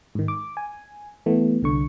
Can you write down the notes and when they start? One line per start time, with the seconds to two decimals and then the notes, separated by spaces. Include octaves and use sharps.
0.15 G#2 D#3
0.28 D6
0.57 G#5
1.26 E3 A3 B3
1.63 C2 D3 C#6